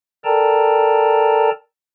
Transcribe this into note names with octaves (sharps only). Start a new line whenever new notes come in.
A4 A#4 D5 G5 A5 A#5